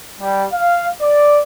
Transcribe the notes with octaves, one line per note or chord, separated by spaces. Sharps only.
G3
F5
D5